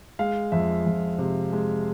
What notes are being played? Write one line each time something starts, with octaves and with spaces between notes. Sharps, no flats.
G#3 F5
F2 E5
F2
C3
G#3